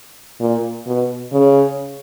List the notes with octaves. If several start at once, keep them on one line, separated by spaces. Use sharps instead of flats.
A#2
B2
C#3